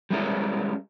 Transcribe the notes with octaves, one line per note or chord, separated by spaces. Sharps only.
G3 G#3 C#4 A#4